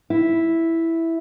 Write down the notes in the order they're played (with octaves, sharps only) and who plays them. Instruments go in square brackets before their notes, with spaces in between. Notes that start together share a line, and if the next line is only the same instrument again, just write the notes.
[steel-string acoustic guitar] E4